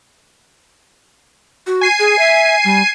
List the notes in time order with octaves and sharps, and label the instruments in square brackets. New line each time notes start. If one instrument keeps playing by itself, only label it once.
[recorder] F#4
[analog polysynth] G#5 C7 D#7
[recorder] G#4
E5
G3